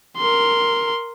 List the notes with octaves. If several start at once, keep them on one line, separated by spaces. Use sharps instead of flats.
A#4 C6